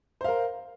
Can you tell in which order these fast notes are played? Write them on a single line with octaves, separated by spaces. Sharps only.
C5 F5 A#4